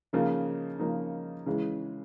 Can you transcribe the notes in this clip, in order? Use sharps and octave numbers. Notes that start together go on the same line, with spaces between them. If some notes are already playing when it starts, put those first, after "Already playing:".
C#3 F3 A#3 D#4
C#3 F3 A#3 D#4
C#3 E3 G#3